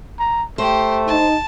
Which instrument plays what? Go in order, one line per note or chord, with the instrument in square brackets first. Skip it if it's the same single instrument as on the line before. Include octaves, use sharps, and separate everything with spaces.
[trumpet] A#5
[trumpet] A3 [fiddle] G4 [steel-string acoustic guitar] C5
[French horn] D#4 [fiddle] A5